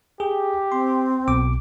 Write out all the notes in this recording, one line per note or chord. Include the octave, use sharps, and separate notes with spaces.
G4 G#4
C4 C6
B1 B2 D6